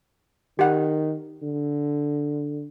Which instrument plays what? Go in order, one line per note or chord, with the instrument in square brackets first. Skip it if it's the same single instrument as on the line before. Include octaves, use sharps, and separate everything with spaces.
[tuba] D#3 [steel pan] G4 F#5
[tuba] D3